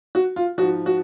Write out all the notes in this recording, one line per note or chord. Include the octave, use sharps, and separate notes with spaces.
F#4
F4
G#2 F3 F#4
F#4